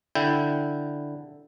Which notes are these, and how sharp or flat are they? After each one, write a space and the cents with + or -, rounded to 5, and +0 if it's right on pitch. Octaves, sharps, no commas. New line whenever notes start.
D3 +0 E4 +0 G5 +0